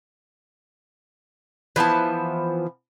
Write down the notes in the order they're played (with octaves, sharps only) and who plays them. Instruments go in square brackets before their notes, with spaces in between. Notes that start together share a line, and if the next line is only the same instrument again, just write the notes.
[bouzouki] E3 F3 B3 A5